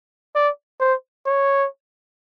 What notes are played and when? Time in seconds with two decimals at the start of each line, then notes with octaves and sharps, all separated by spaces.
0.35 D5
0.80 C5
1.26 C#5